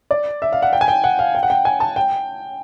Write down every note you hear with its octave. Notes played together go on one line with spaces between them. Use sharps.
D5
E5
F5
F#5
G5
G#5
G5
F#5
F5
G5
F#5
G5
G#5
A5
G5